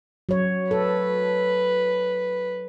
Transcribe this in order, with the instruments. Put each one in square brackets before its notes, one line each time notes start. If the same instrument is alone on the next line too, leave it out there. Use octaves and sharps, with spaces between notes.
[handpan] F#3 C#5
[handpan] A4 [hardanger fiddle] B4